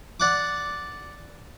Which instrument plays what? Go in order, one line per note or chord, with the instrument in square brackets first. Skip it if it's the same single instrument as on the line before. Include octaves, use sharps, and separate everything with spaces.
[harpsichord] D5 F#5 D6